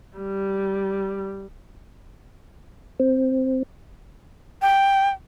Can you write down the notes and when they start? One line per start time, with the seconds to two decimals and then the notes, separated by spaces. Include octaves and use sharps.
0.17 G3
3.00 C4
4.62 G5